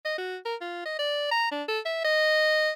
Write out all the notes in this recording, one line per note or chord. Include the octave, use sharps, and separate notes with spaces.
D#5
F#4
A#4
F4
D#5
D5
A#5
D4
A4
E5
D#5